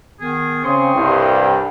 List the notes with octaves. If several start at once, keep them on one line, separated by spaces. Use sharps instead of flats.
D#3 B3 G#4
C#3 C4 C6 C#6 D#6
C2 G2